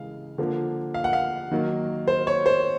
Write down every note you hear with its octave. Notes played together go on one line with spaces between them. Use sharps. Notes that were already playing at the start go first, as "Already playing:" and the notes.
Already playing: C#3 E3 G#3 F5
D3 F3 A#3
F5
F#5
F5
D#3 F#3 A#3
C5
C#5
C5